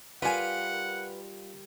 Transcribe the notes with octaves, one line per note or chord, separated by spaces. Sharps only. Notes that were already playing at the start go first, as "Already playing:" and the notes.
G3 F4 A#4 B4 D5 F5 F#5 G#5